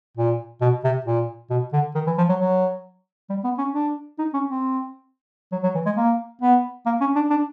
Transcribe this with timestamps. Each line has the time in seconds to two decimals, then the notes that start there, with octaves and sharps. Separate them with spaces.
0.17 A#2
0.61 B2
0.84 C3
1.06 A#2
1.50 B2
1.73 D3
1.95 D#3
2.07 E3
2.18 F3
2.29 F#3
2.40 F#3
3.29 G3
3.44 B3
3.58 C#4
3.74 D4
4.18 D#4
4.33 C#4
4.48 C4
5.52 F#3
5.63 F#3
5.75 E3
5.86 G#3
5.96 A#3
6.41 B3
6.86 A#3
7.00 C#4
7.15 D4
7.30 D4